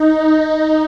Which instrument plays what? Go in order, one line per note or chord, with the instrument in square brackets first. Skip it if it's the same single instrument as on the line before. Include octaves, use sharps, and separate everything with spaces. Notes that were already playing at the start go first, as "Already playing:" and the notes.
Already playing: [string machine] D#4